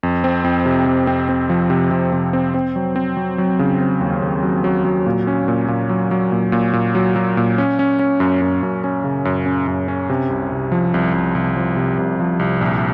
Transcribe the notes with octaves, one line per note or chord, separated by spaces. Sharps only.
F2
C4
F2
C3
F2
C4
C4
F3
C3
C3
C3
C4
C4
F#3
C4
F#3
F#3
C#3
C4
D#2
D#2
F#3
F#3
F#3
A#2
C#4
A#2
A#2
F#3
F#3
A#2
A#2
A#2
F#3
F#3
A#2
C#4
C#4
C#4
F#2
F#2
F#2
C#4
C#3
F#2
C#4
F#2
C#4
C3
C2
C2
F3
C2
C2
C2
F3
C3
C2
F3
C2
A#1